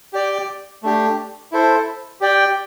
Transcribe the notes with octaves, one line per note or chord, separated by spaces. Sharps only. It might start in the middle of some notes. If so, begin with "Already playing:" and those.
G4 D5 G5
A3 D4 G4
E4 A4 C5
G4 D5 G5